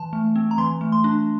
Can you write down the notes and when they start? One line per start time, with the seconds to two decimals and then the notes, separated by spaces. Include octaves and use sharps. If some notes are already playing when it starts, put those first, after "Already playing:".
Already playing: E3 A5
0.13 A3
0.36 C4
0.51 A#5
0.58 E3 C6
0.81 A3
0.92 C6
1.04 D4